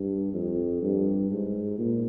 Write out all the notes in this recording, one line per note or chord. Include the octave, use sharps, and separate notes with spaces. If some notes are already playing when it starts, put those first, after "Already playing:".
Already playing: G2
F2
G2
G#2
A#2